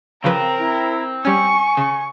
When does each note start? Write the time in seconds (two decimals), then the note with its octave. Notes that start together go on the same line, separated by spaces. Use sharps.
0.24 C#3 F3 C4 A#4 B4
0.59 E4
1.25 G3 C#4 G#5 C#6
1.77 C#3 C#6